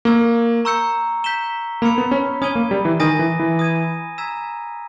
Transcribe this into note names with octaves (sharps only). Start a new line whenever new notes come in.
A#3 C#6 E6 G#6
A#5 C#6 E6 G6 C#7
G6 B6 E7 G7
A#3 B5 E6 G#6 C#7 E7
B3
C#4
C#4 D#6 G#6 D#7 G7
A#3
G3
E3
D#3 G#5 D#6 A#6 D#7
E3
E3
D#6 G#6 D#7
A#5 E6 G#6 B6 E7